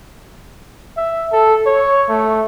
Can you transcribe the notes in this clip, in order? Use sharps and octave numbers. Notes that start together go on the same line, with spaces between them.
E5
A4
C#5
A3